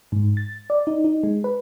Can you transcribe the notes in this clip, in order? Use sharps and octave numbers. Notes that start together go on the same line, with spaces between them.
G#2
A6
D5
D#4
D#4
G#3
B4